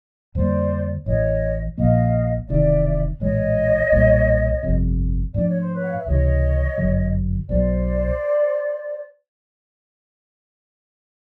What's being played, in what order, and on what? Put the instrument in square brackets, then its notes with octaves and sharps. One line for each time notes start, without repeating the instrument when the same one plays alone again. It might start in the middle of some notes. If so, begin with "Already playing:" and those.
[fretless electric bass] F2 D3 G3 A#3 [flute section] C5 D5
[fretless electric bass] A1 A2 E3 A3 [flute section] C#5 D#5
[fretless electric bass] A#1 A#2 F3 A#3 [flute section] D#5 F5
[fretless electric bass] E1 E2 C3 D#3 [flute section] D5 E5
[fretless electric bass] A#1 A2 E3 G#3 [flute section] C#5 D#5
[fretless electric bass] B1 A#2 G3
G1 F2 C3
[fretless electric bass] G#2 F3 A3 D4 [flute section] D5
[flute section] C#5
C5
B4 C#5
F#5
F5
E5
[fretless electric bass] C#2 C3 E3 [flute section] C#5 D#5
[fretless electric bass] G1 F#2 D3 F#3
[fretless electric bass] B1 B2 F#3 [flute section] C5 D5